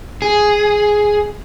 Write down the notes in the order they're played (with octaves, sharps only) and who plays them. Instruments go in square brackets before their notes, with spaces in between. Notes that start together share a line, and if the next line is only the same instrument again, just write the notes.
[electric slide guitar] G#4